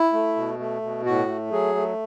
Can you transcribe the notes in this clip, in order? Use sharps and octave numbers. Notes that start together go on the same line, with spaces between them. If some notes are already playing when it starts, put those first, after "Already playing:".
Already playing: E4
A3
B2
A3
B2
A2 F#4
A3
F#3 G#4
A3